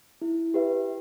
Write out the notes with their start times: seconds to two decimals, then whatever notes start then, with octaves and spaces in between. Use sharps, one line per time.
0.22 E4
0.54 G4 B4 E5